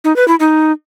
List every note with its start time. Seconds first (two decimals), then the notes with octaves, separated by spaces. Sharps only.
0.04 D#4
0.16 B4
0.28 E4
0.40 D#4